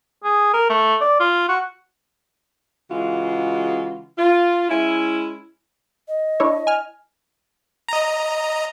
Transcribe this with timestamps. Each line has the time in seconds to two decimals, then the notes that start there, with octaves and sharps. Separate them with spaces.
0.24 G#4
0.54 A#4
0.70 A3
1.01 D5
1.20 F4
1.49 F#4
2.91 C#3 E3 G#3 F4 F#4
4.18 F4
4.70 G#3 C#4 E4
6.08 D#5
6.40 D4 E4 C#5
6.67 G#5 F6
7.89 D#5 A#5